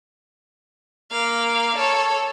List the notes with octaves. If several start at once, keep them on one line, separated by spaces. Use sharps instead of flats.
A#3 F5
A4 C#5